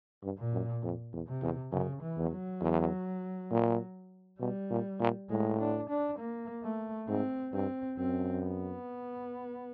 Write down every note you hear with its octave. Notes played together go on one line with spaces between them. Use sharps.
G2
A#2
F#2
F2
E2
C3
E2
F#2 C#3
E3
E2
F#3
E2
A#2
B2 G3
A#2
A#2
A2 G#3
D4
D4
A#3
A3
G#2 C4
G2 C4
F#2 C4
B3